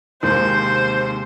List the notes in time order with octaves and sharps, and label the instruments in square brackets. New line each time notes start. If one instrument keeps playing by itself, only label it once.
[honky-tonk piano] D#2 [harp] C3 G#3 C4 [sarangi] C5 [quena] G6